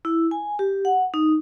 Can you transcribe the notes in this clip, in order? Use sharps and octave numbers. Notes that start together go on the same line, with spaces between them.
E4
G#5
G4
F#5
D#4